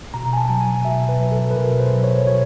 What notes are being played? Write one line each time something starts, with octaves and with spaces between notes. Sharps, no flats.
B2 A#5
G#5
A5
F#3
G#5
B2 E5
B4
F#3
A4
B4
B2 A#4
C5
F#3
C#5
B2 C#5